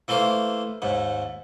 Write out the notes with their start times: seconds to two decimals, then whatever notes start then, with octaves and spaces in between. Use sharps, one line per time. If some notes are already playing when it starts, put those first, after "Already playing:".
0.08 E3 A3 A#3 C5 F5
0.82 D#2 G#2